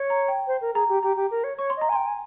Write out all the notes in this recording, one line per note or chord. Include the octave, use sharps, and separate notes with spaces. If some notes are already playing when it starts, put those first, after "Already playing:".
Already playing: C#5
A#5
G5
C5
A#4
G#4 A#5
G4
G4 A#5
G4
A#4
C#5
C#5 C#6
C6
D#5 A#5
G#5
G5 C6
G#5